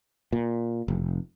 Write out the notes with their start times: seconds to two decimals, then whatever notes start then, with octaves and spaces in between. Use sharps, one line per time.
0.32 A#2
0.88 F1